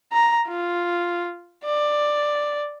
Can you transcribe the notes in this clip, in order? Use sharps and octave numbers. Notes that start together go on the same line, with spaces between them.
A#5
F4
D5